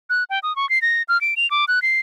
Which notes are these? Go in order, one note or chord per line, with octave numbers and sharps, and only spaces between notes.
F#6
G5
D#6
C#6
C7
A#6
F6
D7
F7
D6
F#6
C7